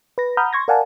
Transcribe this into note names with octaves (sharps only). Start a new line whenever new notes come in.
B4 A#6
F#5 A#5 B5 D#6 F6 G6
C6 C#6 G#6 A#6
A#4 D5 F5 F#5 G#5 A5